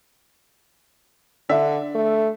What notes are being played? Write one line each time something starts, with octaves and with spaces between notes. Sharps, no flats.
D3 D4 E5
A3